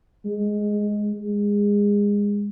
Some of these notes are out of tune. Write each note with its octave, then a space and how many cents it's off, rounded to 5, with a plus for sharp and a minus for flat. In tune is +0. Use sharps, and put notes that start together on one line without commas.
G#3 +5
G#3 -25